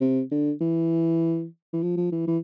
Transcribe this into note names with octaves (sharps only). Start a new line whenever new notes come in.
C3
D3
E3
E3
F3
F3
E3
E3